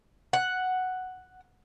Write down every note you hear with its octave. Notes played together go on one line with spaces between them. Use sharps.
F#5